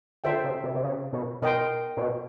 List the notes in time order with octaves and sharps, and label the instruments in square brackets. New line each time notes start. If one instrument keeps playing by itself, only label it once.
[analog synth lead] D3 [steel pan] F4 A4 C5 E5 G5
[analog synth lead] C#3
C3
C3
C#3
B2
[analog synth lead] B2 [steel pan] A#4 D#5 G5 C6
[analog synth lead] A#2
B2